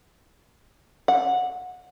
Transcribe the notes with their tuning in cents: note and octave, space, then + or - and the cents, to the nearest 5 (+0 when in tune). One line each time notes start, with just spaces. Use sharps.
F#5 -25